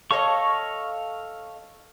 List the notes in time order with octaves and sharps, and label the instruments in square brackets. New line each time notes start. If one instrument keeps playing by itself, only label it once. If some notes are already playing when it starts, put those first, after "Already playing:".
[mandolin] A4 C#5 D#5 [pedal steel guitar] F5 C#6